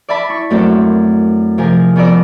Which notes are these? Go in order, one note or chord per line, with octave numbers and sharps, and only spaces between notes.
D5 E5 A5 B5
E4 C#6
F#2 A3 A#3 C4 D4
C3 F3 G#4 A#4 G#5 D#6
F2 B3 A#4 D5 E6